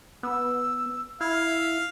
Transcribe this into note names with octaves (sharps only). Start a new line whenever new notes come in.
B3 E6
E4 F5 G#6
E5